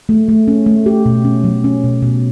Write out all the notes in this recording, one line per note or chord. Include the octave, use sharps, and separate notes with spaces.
A3
A3
C#4
A3
G4
B2
C#4
F#3
C#4
B2
B2